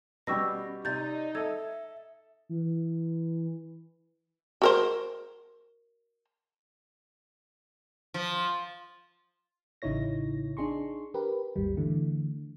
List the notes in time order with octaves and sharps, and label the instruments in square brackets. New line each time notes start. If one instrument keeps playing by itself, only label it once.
[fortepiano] B2 G3 [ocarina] C#4 [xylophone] C#6 E6 A#6
[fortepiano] C3 [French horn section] D#4 [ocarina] D5 [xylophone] G6 A6
[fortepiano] A4 D#5 [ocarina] E5 [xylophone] G#6
[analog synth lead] E3
[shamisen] F#4 A#4 C5
[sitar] F3
[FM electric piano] A1 C#3 D#4 E4 C#5 A#6
D4 D#4 G#4 C6 C#6
G4 A#4 B4
G#1 D#2 G3
D3 E3 A3